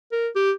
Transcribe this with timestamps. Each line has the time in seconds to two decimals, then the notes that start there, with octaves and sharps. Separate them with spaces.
0.12 A#4
0.35 G4